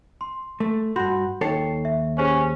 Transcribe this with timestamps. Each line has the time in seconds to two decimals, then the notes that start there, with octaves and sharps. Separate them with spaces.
0.21 C6
0.60 A3
0.96 G2 F#4 B5 C6 G6
1.41 D#2 D#4 A4 C#5 G5 C7
1.85 E5
2.18 C#4 G4 G#4 C5